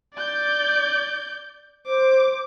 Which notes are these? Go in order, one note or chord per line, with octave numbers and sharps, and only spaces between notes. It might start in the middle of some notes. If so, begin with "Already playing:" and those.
D5 G6
C5 D6